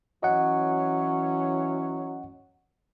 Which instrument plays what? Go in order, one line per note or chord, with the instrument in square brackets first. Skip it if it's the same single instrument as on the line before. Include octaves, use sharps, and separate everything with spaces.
[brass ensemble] E3 C#4 [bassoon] F#3 [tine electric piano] D#5 F#5